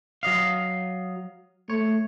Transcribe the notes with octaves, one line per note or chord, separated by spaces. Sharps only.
F#3 D#5 F5
A3 C#5